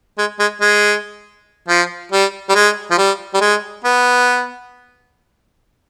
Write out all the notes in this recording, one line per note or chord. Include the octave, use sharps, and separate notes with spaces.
G#3
G#3
G#3
F3
G3
G3
G#3
F3
G3
G3
G#3
B3